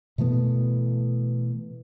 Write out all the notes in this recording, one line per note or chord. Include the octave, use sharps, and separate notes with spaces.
B2 E3 A3 B3